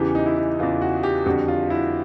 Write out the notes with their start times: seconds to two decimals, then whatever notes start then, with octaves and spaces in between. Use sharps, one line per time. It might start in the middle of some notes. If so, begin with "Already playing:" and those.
Already playing: E2 C#3 E3 G4
0.15 D#4
0.26 E4
0.37 D#4
0.59 E2 C#3 E3 F4
0.82 F#4
1.03 G4
1.26 F2 D3 G3 F#4
1.48 F4
1.70 E4